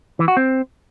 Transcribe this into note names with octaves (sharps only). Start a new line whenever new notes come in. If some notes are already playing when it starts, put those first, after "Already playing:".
E3
F#4
C4